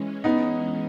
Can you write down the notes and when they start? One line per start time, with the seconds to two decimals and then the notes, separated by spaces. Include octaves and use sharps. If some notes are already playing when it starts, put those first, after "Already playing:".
Already playing: E3 G#3 C#4
0.24 B3 D#4